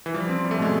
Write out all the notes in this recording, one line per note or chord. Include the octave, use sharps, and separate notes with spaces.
E3
F3 G3
C4
G3
A3
B2 G#3